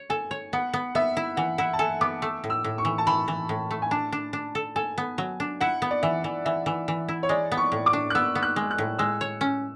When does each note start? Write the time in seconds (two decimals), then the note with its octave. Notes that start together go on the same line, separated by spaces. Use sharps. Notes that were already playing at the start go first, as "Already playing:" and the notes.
Already playing: C#5
0.10 A4 G#5
0.31 C#5
0.53 B3 F#5
0.73 B3
0.95 B3 E5
1.17 E4
1.37 E3 F#5
1.58 E4 F#5
1.73 A5
1.79 A4 G#5
2.01 B3 D6
2.22 A3 E6
2.44 A2
2.50 E6
2.64 A2
2.78 C#6
2.85 E3
2.98 A5
3.07 E3 B5
3.28 E3
3.49 A2
3.71 A3
3.82 G#5
3.91 D4 A5
4.12 D4
4.33 D4
4.55 A4
4.76 A4 G#5
4.98 B3
5.18 F#3
5.40 D4
5.61 E4 F#5
5.82 B3
5.91 D5
6.03 E3 E5
6.24 E3
6.45 E3 E5
6.66 E3
6.88 E3
7.09 E4
7.23 C#5
7.29 G#3 D5
7.52 B3
7.57 C#6
7.72 A2
7.86 D6
7.93 D4
8.10 F#6
8.15 B3 E6
8.35 B3
8.43 F#6
8.56 G#3
8.71 F#6
8.78 A2
8.99 G#3 E6
9.21 C#5
9.41 C#4